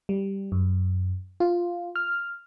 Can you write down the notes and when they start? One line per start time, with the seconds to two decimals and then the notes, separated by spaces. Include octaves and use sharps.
0.09 G3
0.52 F#2
1.40 F4
1.96 F6